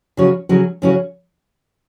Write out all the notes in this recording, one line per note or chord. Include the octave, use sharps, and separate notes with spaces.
C#3 F#3 C#4 F#4 C#5
C#3 F#3 C#4 F#4 C#5
C#3 F#3 C#4 F#4 C#5